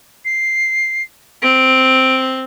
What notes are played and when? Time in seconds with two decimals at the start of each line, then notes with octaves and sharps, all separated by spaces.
0.25 C7
1.42 C4 D7